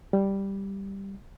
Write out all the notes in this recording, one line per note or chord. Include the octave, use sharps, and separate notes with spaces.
G3